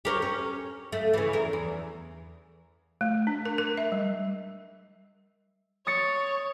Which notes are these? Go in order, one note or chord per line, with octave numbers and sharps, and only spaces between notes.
G4 A#4 C#5
C#4
A3
C#3 E3
E2 A#4
E2
A3
D4
A#4
A#4
E5
G3
C#5 D#6 A6 C#7